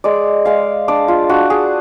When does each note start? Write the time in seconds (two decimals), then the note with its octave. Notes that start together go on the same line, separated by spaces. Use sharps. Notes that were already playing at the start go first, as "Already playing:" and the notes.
0.04 G#3 D5
0.45 G#3 F5
0.88 D4 D5
1.08 F4
1.29 D4 F#4
1.50 G#4